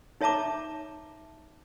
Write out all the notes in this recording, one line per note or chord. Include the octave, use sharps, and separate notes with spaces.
D#4 C#5 E5 A5 A#5 D6